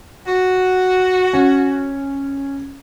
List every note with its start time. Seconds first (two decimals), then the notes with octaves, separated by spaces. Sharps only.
0.26 F#4
1.33 C#4